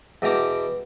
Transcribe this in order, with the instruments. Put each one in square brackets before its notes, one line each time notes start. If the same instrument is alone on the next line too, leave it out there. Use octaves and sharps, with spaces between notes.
[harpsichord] E2 B2 G5 A#5 D6